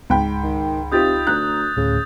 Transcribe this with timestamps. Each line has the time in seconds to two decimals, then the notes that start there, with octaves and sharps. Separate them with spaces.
0.10 C#2 G#2 G5 B5
0.43 D#3
0.92 C3 D#4 F4 G4 D#6 G6 A6
1.27 D2 A#5 F#6
1.77 D2 A2 C#3